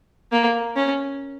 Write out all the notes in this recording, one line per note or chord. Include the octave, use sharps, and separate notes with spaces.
A#3
C#4